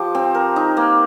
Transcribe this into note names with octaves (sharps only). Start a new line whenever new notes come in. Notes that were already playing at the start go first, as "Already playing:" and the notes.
Already playing: F3 G4
C4
A#4
D#4
A#3